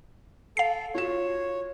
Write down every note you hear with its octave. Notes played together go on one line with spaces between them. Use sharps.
A4 F5 C7
F4 F#4 C#5 E7